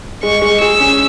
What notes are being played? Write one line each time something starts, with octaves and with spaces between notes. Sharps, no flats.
G#3 C#6
G#3
G#4 E6
C#4